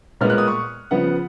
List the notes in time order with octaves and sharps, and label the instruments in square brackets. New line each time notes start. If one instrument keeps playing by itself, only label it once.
[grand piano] A#2 G#3 B3 F6
F#6
D#6
C#6
C#3 F3 B3 F#5